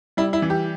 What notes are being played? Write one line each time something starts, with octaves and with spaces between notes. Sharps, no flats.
G3 E4
E4
E3
G4